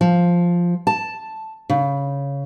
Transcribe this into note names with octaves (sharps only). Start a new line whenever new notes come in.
F3
A5
C#3